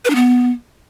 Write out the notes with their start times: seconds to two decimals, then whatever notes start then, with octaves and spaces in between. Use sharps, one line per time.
0.05 B4
0.10 D4
0.15 B3